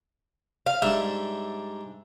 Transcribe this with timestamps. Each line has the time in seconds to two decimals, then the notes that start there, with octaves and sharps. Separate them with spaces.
0.66 F5
0.82 G#2 G3 D4 E5